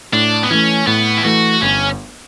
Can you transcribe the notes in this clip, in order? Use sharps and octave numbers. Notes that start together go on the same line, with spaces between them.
A2 D4
B3
E3 A3 C#4
A2 B3
E4
E3 A3 F#4
G1 C#4